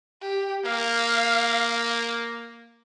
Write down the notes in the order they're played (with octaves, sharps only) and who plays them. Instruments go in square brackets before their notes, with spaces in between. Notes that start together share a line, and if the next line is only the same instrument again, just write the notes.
[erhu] G4
[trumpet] A#3 [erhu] F5